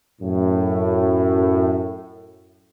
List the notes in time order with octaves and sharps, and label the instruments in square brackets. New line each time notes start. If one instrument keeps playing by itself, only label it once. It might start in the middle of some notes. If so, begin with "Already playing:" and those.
[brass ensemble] F#2 A2